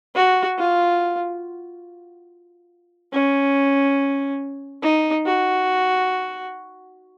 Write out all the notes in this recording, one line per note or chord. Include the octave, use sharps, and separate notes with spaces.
F#4
F4
C#4
D#4
F#4